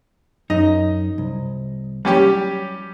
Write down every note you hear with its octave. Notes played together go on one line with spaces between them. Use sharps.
F#2 D#4 D#5
C2
F#3 G3 C#4 G4